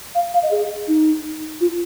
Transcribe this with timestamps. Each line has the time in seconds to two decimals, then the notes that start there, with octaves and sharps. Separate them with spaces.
0.15 F5
0.34 F5
0.43 D#5
0.51 G#4
0.88 D#4
1.61 F4